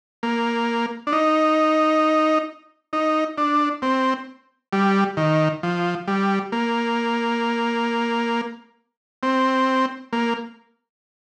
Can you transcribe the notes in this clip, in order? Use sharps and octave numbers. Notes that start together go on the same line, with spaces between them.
A#3
D4
D#4
D#4
D4
C4
G3
D#3
F3
G3
A#3
C4
A#3